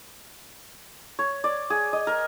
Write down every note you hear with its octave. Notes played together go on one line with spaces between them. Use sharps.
C#5
D5
G#4
D#5
A#4